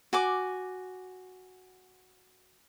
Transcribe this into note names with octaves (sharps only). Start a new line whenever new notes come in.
F#4 G#5 D6